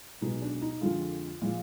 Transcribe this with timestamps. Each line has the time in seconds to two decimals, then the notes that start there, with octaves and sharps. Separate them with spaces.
0.21 B1 B2 G#3 D#4
0.42 D4
0.61 D#4
0.81 F2 D3 G#3 F4
1.41 A#2 F3 G#3